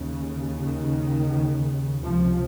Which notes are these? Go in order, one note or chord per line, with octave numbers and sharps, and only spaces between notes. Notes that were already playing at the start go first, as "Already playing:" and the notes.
Already playing: D#2 C#3
D#3
C#2 C3 F3